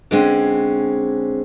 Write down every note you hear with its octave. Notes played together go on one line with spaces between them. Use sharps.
D3 G#3 C4 C#4